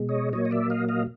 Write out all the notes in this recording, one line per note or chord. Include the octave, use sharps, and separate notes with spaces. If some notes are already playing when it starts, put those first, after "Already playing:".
Already playing: B2 G#3
C#5 D#5
A#2 F#3 A#3 C#5 D#5
D#5
D5 E5
D#5 F5
D#5 F5